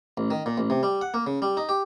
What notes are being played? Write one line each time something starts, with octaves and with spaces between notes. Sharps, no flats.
A1
D#3
A#2
A1
C3
G3
F#5
A#3
C#3
G3
D#4
G4